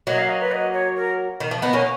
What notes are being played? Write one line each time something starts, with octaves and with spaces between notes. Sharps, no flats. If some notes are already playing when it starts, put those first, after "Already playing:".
F#3 A#3 D#5
F5
D#5
B4
D#5
C#5
A#4
D#3
F3
B3 D#4
A#3 C#4